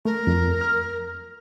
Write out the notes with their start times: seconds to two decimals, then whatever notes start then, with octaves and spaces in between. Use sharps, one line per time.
0.05 A3 A#4
0.27 F2
0.61 F6